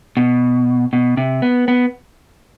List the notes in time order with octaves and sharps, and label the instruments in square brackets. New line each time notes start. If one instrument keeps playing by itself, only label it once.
[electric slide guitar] B2
B2
C3
B3
B3